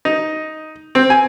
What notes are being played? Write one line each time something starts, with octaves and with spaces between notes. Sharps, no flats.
D#4
C4
G#5